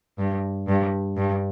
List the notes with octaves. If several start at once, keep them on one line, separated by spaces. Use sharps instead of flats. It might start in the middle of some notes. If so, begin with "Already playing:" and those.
G2
G2
G2